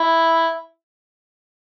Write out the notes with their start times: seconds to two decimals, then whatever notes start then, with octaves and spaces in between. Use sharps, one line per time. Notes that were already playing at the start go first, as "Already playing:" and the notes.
Already playing: E4